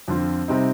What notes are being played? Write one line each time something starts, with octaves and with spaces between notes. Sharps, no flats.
F2 D3 F3 C4
C3 G3 C4 D#4